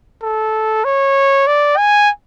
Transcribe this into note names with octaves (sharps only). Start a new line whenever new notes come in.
A4
C#5
D5
G#5